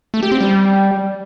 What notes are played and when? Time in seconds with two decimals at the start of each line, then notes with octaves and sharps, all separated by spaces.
0.14 A3
0.23 G4
0.32 C4
0.40 G3